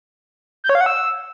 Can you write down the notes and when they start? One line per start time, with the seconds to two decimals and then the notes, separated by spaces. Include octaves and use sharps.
0.64 G6
0.69 C#5
0.75 F5
0.81 F#5
0.86 E6